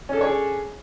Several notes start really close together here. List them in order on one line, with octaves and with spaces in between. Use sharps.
C#4 A4 D4 C#5 G#4